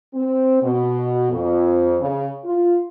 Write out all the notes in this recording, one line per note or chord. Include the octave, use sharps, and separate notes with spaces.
C4
B2
F2
C#3
F4